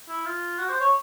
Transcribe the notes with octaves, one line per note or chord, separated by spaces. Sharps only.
E4
F4
F#4
C5
C#5